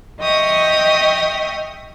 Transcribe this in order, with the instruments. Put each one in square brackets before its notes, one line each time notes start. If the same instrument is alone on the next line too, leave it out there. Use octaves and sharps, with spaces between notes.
[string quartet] D#5 E5 G5 C#6 D#6 F6